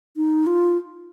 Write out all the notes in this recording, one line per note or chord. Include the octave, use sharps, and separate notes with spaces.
D#4
F4